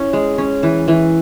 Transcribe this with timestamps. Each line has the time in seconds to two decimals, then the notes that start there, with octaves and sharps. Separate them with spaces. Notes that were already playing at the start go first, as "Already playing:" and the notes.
Already playing: C#4 E4
0.13 G#3
0.38 C#4
0.63 E3
0.88 E3